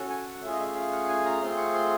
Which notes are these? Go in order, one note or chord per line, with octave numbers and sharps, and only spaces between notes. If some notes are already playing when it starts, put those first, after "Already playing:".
Already playing: C#4 F#4 A4
G#5
F#5
A3 C#4 F4 G#4 E5
D#5
E5
F5
F#5
G#5
A#5
A3 C4 F4 G#4 C6
C#6
C6